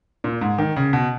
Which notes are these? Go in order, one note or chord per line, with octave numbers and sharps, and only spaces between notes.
A#2
G#2
D#3
C#3
B2